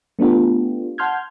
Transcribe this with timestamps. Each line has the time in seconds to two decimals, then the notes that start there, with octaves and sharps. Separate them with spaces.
0.19 A3 B3 D4 F4 G4
0.98 F#5 A5 C6 F6 G6 G#6